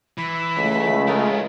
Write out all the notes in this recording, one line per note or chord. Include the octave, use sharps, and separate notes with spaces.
E3 B5 E6
C#2 C#3 G#3 A3
E4 F4 A#4